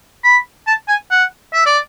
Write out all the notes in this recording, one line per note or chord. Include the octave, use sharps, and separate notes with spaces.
B5
A5
G#5
F#5
E5
D5